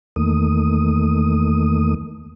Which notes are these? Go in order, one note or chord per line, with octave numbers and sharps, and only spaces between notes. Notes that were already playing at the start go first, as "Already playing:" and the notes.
E2 D#3 A3 A#3 D#6